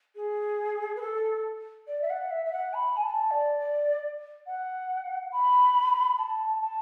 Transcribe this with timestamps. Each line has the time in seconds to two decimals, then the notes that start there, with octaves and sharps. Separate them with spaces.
0.15 G#4
0.96 B4
1.01 A4
1.87 D5
2.01 E5
2.10 F#5
2.30 E5
2.45 E5
2.53 F#5
2.74 B5
2.96 G#5
3.03 A5
3.30 D5
3.59 D5
4.46 F#5
5.32 B5
6.18 A5
6.61 A5